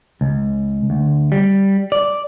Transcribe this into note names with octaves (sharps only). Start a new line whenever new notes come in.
C#2
D2
G3
D5